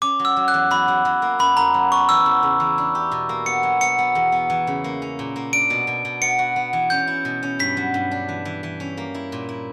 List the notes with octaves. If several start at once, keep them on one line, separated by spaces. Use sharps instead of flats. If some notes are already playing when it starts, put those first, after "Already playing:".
C#4 D6
F#3
E6
F#3
F#6
E2
F#3 B5
F#3
F#3
A#3
F#2 B5
F#2 A#5
F#3
B3 C#6
E3 E6
E2
C#3
E3
D4
G4
B2
A#3
B3 C#7
F#3
B3 C#7
B3
E2
B3
E3
C#3
A#3
C#4
A#2
A#3
D4 D7
B2
B2
B2
B3 C#7
F#4
B3
E3
C#4 G6
E4
B2
C#4
G2 B6
F#3
G2
D4
E3
E3
E3
C#4
A#3
E4
A#2
E4